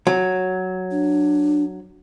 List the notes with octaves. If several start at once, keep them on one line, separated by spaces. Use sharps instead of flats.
F#3
D4